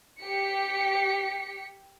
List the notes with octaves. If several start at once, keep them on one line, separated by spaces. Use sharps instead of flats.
G4 B6 C#7